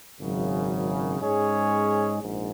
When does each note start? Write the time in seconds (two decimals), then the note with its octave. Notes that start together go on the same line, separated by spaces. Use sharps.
0.19 G#1 F#2 C#3 F#3
1.20 G#2 G#3 C#4 G#4 C#5
2.22 A#1 G#2